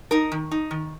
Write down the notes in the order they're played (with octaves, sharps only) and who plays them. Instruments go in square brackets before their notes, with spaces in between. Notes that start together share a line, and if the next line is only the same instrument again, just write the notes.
[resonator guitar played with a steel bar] D#4 A#4
D#3
D#4
D#3